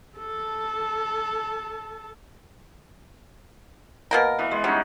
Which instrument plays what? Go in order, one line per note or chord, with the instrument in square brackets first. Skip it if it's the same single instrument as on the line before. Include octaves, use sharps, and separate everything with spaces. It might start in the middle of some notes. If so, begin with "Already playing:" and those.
[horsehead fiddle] A4 A5
[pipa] B2 A#3 A#4
[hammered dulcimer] E3 B3
G#3
[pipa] F#3 [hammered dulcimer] G3 C#4 D#4